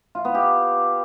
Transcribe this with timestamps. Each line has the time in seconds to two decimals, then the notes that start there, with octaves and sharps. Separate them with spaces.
0.15 F4
0.25 B3
0.34 G4